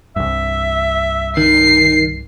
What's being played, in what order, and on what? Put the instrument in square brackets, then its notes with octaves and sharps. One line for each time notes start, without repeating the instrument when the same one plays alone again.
[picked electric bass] C2 G2 [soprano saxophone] E5
[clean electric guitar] D#3 [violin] C7